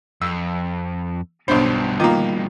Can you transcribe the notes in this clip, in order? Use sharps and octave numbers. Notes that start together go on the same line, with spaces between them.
F2 E6
B1 G2 B2 D4 C5
D#3 A#3 F4